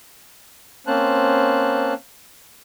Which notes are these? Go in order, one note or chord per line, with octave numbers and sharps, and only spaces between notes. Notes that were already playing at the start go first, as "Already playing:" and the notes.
A#3 C4 C#4 C5 A5 F#6